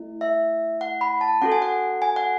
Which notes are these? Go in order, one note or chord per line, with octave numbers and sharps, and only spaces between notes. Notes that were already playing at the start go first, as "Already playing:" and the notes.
Already playing: A3 E4
E5
F#5
B5
A5
C#4 F#4 A4 F#5
G#5
F#5
G#5
F#5